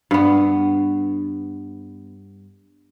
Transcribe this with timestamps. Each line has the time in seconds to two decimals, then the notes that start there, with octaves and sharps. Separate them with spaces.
0.11 G2 B3